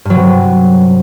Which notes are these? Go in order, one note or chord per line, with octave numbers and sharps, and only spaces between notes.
G2 C3 F#3